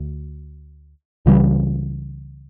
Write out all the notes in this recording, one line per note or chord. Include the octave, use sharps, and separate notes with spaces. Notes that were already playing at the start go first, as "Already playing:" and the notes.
Already playing: D2
C#2 C#3 E3 G3